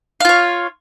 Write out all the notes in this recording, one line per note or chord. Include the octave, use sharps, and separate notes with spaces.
F4 C#5 F5